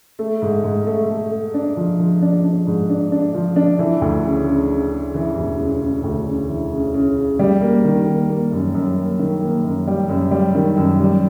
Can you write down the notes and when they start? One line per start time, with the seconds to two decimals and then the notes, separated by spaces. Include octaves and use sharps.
0.19 A3
0.42 G#2
0.64 G#2
0.87 A3
1.10 A3
1.31 A3
1.54 D4
1.77 F3
1.99 F3
2.22 D4
2.43 D4
2.67 G#2
2.90 D4
3.12 D4
3.34 F3
3.56 D4
3.79 E3
4.02 D2
4.25 C#3
4.47 C#3
4.69 C#3
4.92 C#3
5.14 E3
5.36 E1
5.60 C#3
5.81 C#3
6.04 D2
6.27 C#3
6.49 E3
6.72 C#3
6.94 C#3
7.16 C#3
7.39 G3
7.61 A#3
7.84 D#3
8.07 A#3
8.30 A#3
8.52 F#2
8.74 F#2
8.97 A#3
9.19 D#3
9.42 A#3
9.65 F#2
9.87 G3
10.09 F#2
10.31 G3
10.55 D#3
10.77 F#2
11.00 G3